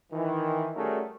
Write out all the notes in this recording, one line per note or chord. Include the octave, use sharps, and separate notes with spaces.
D#3 E3
G3 A3 C#4 F#4 G#4 A#4